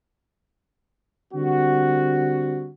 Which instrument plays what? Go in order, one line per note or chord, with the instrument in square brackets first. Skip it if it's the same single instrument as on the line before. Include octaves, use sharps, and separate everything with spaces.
[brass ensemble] D3 G3 C4 F#4